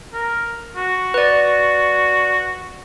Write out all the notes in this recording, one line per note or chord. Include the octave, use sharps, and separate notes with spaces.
A#4
F#4
B4 D5